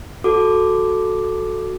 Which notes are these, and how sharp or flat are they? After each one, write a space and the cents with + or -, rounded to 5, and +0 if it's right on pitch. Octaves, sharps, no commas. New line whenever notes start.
F#4 +0 A4 +0 D6 +0